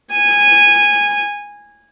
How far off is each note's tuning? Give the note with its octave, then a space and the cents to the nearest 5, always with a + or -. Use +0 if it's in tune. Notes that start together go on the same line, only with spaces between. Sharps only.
G#5 -15